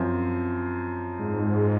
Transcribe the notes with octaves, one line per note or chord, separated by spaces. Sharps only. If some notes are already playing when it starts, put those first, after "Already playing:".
Already playing: F#2 F3 C4
G#2